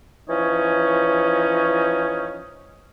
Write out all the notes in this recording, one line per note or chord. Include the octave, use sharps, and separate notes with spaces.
E3 F3 C#4 D#4 C#5